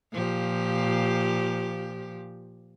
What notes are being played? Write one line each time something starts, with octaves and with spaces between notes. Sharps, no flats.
A#2 F3 G4